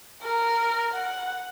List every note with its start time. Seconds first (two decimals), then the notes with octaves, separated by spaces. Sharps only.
0.22 A#4
0.94 F#5